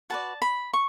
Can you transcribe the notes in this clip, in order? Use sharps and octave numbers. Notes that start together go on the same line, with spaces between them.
F#4 B4 D5 A5
B5
C#6